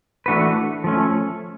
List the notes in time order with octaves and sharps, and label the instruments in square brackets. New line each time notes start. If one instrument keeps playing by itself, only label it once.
[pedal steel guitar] E3 A3 D4 F#4 B4
F3 A3 C#4